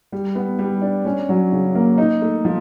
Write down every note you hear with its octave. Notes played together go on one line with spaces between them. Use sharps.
G3
B3
G3
D4
C#4
F#3
C#3
A#3
D#4
A3
F3